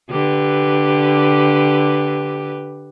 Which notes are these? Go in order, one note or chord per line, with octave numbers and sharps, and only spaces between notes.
D3 G4 B4